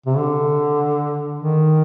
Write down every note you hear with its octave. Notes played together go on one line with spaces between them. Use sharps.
C3
D3
D#3